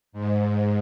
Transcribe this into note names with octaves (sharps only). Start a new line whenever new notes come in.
G#2